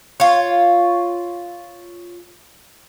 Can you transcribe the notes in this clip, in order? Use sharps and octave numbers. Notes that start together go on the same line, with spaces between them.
F4 C#5